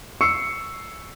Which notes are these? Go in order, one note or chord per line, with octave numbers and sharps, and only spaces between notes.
C#6 E6 C7 C#7